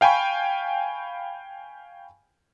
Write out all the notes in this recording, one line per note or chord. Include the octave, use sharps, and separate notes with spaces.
F5 G5 G#5 B5 C#6